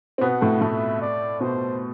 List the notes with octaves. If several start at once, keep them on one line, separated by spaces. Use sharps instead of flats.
C4
B2 B3 F#5
A2 A3
A2 A3 E5
D5
B2 C5